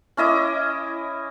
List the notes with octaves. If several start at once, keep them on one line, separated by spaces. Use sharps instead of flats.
C#4 E4 D#5 D6